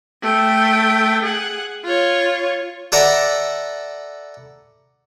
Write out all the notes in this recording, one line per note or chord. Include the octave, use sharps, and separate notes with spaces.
A3 G5
G#4 F#5
F4 C#5
A4 B4 D5 E5 F#5 A#5